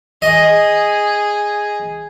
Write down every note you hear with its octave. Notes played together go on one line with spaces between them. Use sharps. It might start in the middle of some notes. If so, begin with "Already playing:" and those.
G#4 D#5